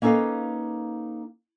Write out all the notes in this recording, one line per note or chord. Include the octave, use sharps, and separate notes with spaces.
A#3 C#4 D#4 A4 B4 F5